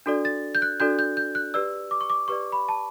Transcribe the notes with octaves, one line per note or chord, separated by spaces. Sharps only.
D4 F#4 A4 D5
A6
G6
F#6
D4 F#4 A4 D5 G6
G6
G6
F#6
G4 B4 D5 E6
D6
C#6
D6
G4 B4 D5 C#6
B5
A5